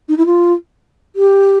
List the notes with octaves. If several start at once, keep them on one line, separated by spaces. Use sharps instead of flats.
D#4
E4
F4
G4